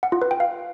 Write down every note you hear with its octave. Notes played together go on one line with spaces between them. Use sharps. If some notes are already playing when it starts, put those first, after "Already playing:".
F#5
F4
B4
G5
F5